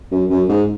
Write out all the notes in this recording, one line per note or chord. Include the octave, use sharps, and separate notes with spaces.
F#2
F#2
G#2